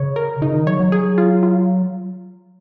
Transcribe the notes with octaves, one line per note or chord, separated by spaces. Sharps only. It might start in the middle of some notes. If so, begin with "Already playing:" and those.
Already playing: C#3 C#5
A#4
C#3 D#4
D#3
F#3 C#5
F#3
G#4
F4
F4